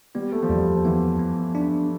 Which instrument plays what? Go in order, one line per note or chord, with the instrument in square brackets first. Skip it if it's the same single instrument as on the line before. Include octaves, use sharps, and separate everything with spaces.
[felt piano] G3 [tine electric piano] B3
[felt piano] A3
F3
[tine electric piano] E2 [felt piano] G3
[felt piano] F3
[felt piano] E3 [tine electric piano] B3
[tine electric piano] B3
D4